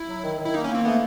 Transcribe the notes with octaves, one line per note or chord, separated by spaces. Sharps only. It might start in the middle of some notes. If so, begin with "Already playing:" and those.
Already playing: E4
F#3
D#3
D#3
E4
A#3 D#4
C#4
A#3 C4
A3 B3